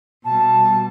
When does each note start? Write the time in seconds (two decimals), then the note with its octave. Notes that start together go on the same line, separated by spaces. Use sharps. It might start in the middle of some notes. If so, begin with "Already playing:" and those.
0.24 B2 G3 A5